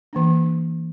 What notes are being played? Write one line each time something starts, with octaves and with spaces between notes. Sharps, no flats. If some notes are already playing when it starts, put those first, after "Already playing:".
E3 A#3 D4